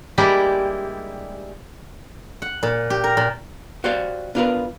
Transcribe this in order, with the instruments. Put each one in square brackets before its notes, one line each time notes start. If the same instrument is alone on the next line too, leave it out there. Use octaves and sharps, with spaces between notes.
[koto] G3 G#3 A#3 D4 E4 G4
[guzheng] F#5
A#2
G4
A#4
A#2
[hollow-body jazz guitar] F#4 G4 C5 D5 F5
B3 D4 F4 G#4 A#4 B4